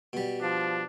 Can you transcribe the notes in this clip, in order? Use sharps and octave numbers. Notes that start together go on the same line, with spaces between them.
B2 G3
F3 D4